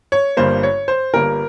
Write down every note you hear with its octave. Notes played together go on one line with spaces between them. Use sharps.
C#5
G1 G2 G3 A#3 C5
C#5
C5
G1 G2 G3 A#3 A#4